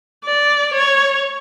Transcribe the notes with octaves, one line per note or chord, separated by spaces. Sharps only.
D5
C#5